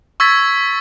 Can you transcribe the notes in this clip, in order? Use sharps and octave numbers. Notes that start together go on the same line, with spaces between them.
C#6 E6 G#6 A6 B6